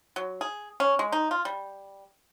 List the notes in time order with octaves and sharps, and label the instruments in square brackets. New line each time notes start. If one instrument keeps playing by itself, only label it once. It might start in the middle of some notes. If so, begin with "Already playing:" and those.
[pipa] F#3
G#4
C#4
G#3
D#4
F4
G3